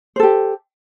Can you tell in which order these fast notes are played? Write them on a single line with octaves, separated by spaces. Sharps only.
C5 A4 G4